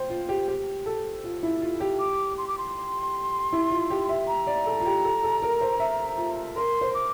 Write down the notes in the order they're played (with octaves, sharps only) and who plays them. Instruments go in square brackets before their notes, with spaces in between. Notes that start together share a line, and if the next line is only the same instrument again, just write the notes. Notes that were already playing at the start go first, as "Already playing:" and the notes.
Already playing: [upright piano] C5 G5
F4
G4
G4
A4
F4
E4
F4
G4
[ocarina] D6
C6
D6
C6
[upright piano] E4
F4
G4
E5
[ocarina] A#5
[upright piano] D5
A4
F4
G4
A4
A4
A#4
C5
E5
F4
[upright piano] A#4 [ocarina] C6
[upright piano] C5
[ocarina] D6